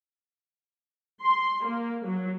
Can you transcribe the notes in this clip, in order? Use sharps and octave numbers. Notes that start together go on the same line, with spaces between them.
C6
A#3
F#3